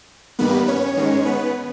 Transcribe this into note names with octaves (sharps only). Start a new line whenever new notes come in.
G2 D#3 G3 A#3 B3 B4
C#4 C#5
G#2 D#3 G#3
B3 B4